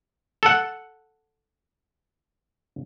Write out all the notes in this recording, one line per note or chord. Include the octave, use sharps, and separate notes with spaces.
A4 F#5